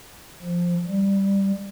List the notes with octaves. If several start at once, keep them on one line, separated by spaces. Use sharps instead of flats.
F3
G3